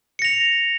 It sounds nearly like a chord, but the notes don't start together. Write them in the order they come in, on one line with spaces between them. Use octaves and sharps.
C#7 A#6 F7